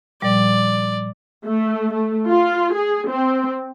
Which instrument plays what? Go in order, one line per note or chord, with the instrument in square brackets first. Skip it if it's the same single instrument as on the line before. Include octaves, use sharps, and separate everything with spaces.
[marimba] A#2 F3 G3 [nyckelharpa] D5
[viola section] A3
A3
F4
G#4
C4